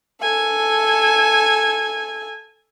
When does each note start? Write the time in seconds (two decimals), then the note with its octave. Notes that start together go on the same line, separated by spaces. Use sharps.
0.22 A4 G#5